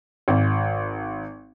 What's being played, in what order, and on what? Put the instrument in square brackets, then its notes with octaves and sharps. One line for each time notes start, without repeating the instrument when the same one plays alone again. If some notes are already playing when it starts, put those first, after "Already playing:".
[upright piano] G#1